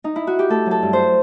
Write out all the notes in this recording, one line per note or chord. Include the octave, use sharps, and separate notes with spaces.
D#4
E4
F#4
G4
A3 A4
F#3
A4
G2
C5